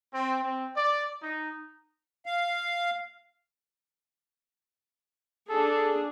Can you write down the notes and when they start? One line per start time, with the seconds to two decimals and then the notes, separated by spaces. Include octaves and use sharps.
0.14 C4
0.43 C4
0.76 D5
1.22 D#4
2.26 F5
5.49 D4 G#4 A4